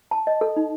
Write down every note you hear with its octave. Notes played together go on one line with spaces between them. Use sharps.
A5
D#5
A4
D#4